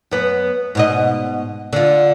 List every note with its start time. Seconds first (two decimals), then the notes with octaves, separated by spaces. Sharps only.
0.11 F#2 B3
0.75 G#2 B2 D#5
1.73 D3 F4